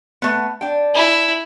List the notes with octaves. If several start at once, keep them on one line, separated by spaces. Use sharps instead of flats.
A3 B3
D4 G5
E4